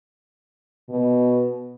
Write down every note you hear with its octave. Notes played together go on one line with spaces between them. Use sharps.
B2